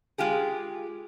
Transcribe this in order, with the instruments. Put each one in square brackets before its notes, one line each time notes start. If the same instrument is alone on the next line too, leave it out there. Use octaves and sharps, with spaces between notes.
[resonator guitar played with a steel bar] G#3 F4 G4 G#4